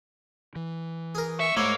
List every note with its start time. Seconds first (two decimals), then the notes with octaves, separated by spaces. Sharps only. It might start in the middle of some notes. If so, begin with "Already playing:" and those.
0.56 E3
1.15 G#4 A#4
1.40 A#2 E5 C#6
1.57 G#2 A3 A#3 E4 C#5